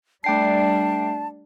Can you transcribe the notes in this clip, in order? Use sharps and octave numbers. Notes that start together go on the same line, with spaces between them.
G3 A3 D4 G5 A5 C7